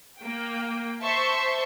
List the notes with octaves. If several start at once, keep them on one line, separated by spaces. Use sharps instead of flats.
A#3 G5
C5 E5 A5 C6 C#6